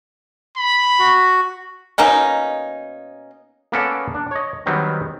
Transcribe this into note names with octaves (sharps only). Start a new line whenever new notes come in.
B5
F#4
B2 A#3 C#4 D#4
A#3 B3 C#4 A4 D5
D4
C#5 D#5
D#3 F#3 G3 B3 C4